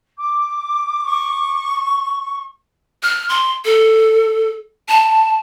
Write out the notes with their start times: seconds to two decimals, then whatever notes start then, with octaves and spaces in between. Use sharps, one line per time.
0.18 D6
1.05 C#6
3.03 F6
3.29 C6
3.65 A4
4.89 A5